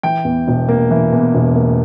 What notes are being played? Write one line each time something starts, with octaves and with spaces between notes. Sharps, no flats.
E3 G5
E2
E1
A#3
E3
E2
E1
A#3